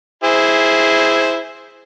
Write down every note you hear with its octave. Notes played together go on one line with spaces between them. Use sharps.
E4 G#4 C5